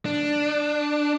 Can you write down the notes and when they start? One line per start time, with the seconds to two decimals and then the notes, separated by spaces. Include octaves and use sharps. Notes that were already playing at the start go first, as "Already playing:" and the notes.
0.05 D4